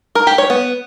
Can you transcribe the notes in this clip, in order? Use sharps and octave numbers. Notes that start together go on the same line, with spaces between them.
A#4
G4
C#5
B3